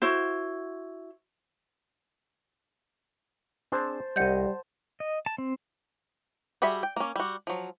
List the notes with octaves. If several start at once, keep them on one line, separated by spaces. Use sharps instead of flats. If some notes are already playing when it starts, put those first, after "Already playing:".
E4 F#4 C5
C4 D4 G#4 C5 A5
C2 G3 D#5 F#5 G6
D#5
A5
C4
G3 F#4 G#4 E5 B5
G5
A#3 C#4
G3 F#4
F3 F#3